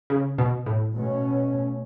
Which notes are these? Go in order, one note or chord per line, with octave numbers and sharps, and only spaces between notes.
C#3
B2
A2
B2 A3 C#4